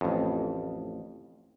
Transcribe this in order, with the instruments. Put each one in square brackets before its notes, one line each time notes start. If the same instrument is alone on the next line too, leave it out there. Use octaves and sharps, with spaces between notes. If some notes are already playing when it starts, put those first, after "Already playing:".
[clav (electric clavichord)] A1 F2